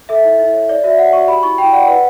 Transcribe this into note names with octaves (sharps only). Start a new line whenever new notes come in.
A4 E5
E4
E4
C#5
C#5 D5
F#4 E5
C#5 F#5
F#4 C#6
G4 B5
E4 C#6
E4 G5
D5 F#5
B4 F#5